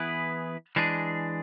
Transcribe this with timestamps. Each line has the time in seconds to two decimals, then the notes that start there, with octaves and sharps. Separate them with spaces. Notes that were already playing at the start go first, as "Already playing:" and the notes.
Already playing: E3 B3 E4 G#4 B4
0.76 E3 G#3 D4 G#4